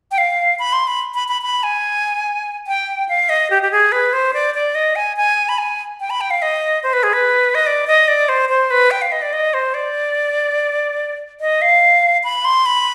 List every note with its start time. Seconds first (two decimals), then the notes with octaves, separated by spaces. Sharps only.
0.11 G5
0.18 F5
0.59 B5
0.73 C6
0.87 B5
1.14 B5
1.28 B5
1.42 B5
1.63 G#5
2.67 G5
3.09 F5
3.29 D#5
3.50 G4
3.62 G4
3.71 G#4
3.92 B4
4.13 C5
4.33 D5
4.54 D5
4.75 D#5
4.96 G#5
5.17 G#5
5.49 B5
5.58 G#5
6.00 G5
6.10 B5
6.21 G5
6.30 F5
6.42 D#5
6.83 C5
6.93 B4
7.03 G#4
7.13 B4
7.55 D#5
7.66 D5
7.87 D#5
8.08 D5
8.29 C5
8.49 C5
8.70 B4
8.91 G5
9.02 F5
9.12 D#5
9.22 D5
9.33 D#5
9.54 C5
9.74 D5
11.40 D#5
11.62 F5
12.24 B5
12.45 C6
12.66 B5